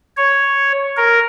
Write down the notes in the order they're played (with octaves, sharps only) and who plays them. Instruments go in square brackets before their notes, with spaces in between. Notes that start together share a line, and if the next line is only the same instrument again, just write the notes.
[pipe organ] C#5
A#4